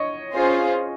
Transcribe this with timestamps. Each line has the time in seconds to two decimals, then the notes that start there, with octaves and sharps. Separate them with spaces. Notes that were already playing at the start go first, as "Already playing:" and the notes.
Already playing: C#5 D#5
0.32 C#4 F4 G#4 C5